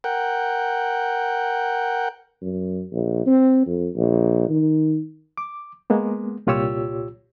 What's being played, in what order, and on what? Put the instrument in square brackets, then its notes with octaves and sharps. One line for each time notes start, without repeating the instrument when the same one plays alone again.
[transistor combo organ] A#4 F#5 G5
[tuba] F#2
A#1
C4
F2
A#1
D#3
[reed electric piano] D6
G#3 A#3 B3
C2 A#2 F4 G4 C#5 E6